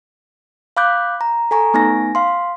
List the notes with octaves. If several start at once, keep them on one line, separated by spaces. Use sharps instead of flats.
F5 B5 D6 F#6 G6
A#5
A4 G#5 A#5 C#6
A3 B3 D#4 G#5 A#6
F5 C6